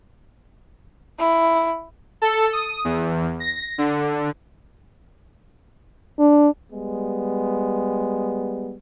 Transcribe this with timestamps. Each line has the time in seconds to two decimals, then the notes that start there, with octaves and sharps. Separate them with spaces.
1.19 E4
2.22 A4
2.53 D#6
2.85 E2
3.40 A#6
3.78 D3
6.19 D4
6.73 G3 G#3 B3